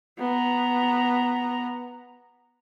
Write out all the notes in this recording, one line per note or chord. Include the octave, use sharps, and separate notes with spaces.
B3 A#5